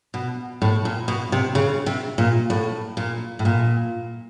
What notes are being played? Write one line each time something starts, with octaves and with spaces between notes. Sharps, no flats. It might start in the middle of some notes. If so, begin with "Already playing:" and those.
B2
A2
A#2
B2
C3
C#3
C3
A#2
A2
A#2
A2
A#2